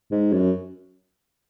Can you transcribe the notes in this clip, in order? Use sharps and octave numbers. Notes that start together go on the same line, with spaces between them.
G#2
F#2